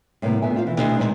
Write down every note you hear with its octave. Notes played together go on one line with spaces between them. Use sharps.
A2 C3 G3 A#3 B3
F2 A#2 B3 E5 G#5
C4 F4 C5 F5
B2 E3
D2 B2 D4 G4 C5 D#5
A#2 C#3 F3 G#3 C4 D#4